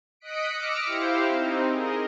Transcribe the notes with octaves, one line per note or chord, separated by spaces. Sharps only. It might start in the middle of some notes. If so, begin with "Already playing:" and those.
D#5 D#6 F#6 B6 C#7 D7
D6 E6 F6 A#6 C#7 D7
E4 G4 C5 F5
C4 D#4
G#4 A#4 D#5